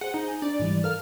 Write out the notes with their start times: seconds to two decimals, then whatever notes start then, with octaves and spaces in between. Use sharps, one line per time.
0.01 G#4 C5 F#5
0.14 D#4
0.28 G#5
0.42 D4 D5
0.60 G#2 E3 G3
0.84 A4 A#4 F5 F6